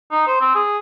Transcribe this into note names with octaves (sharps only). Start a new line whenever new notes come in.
D#4
C5
C4
G#4